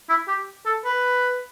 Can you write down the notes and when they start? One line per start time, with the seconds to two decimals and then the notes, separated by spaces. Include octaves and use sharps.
0.09 E4
0.28 G4
0.66 A4
0.85 B4